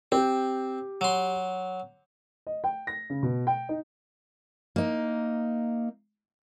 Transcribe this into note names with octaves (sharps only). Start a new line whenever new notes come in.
C4 G4
F#3 C6
D#5
G5
A#6
C#3
B2
G5
D#4
A#3 D#4